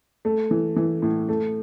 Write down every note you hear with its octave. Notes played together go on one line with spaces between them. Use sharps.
A3
E3
E3
A2
A3